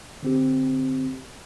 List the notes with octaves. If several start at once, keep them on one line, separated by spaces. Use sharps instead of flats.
D3 C4 G4